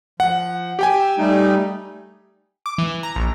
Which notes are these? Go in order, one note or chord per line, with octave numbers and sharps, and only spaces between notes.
F3 F#5
G4 G5 G#5
E6
G3 A3 D#4
D6
E3
A#5
A#1